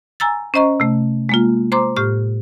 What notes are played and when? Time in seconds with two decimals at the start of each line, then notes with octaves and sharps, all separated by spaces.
0.20 G#5 A#5 E6 A6
0.54 C#4 C5 D#5 A#5 C#6
0.80 C3 A3
1.29 G#3 A#3 F4
1.72 C5 A#5 C6 D6
1.96 A2 G4 F6